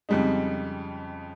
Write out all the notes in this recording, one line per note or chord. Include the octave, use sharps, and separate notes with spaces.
F2 C#3 G3 G#3 D#4